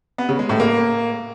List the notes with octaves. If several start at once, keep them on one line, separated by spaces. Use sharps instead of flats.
B3
C#3
G#3
A2
A#3